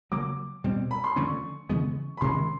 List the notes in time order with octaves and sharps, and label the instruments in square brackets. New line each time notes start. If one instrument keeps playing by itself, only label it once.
[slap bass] C#3 F#3 A#3 [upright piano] D6
[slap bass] B2 G3 C4
[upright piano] B5
C6
[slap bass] D3 F3 A3 C#4 [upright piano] C#6
[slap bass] C#3 E3 G#3 B3
[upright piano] B5
[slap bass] C3 D#3 G#3 C#4 [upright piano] C6